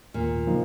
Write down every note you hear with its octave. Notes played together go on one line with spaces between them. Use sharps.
D#2 A#2
C#3 F3 A#3 D#4